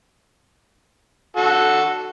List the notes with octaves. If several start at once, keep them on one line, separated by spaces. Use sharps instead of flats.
F#4 A4